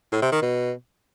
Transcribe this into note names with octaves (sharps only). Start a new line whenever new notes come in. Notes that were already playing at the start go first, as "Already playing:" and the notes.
A2
C3
D#3
B2